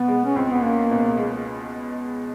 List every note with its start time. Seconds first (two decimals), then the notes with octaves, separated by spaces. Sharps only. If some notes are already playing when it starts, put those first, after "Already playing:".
Already playing: B2 B3
0.08 G#3
0.26 C#4
0.36 C#2 C4
0.51 B3
0.63 A#3 C#4
0.91 B2
1.17 G#3